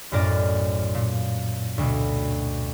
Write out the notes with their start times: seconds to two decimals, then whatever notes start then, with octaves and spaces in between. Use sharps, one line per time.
0.12 B1 F#2 A2 A#4 D5 A6
0.95 A#2
1.78 D2 B2